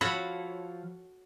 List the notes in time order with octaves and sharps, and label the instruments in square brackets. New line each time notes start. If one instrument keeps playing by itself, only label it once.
[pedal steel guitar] F3 F5 B5 [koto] F#4 A4 C#5